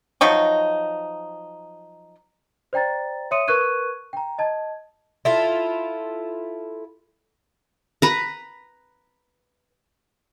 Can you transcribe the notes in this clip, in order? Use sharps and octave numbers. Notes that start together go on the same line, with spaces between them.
F3 F#3 D#4 C#6
C5 D5 G5 A#5 A6
C#5 E5 C6 D#6 C#7 D#7
A#4 B4 C#6 F#6 G#6 D#7
G5 A#5
D#5 A5 G#6
E4 F4 A4
B4 A#5